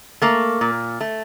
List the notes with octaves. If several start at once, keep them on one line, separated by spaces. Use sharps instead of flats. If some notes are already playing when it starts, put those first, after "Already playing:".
A3 A#3
A#2
A3